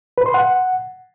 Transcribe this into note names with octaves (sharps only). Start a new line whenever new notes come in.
B4
C6
F#5